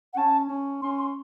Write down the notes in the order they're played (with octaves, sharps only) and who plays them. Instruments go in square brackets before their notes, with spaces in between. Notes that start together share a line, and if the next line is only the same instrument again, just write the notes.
[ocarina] F#5
[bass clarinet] C#4 [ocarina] A5
[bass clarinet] C#4
[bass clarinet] C#4 [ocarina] C6
[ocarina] C6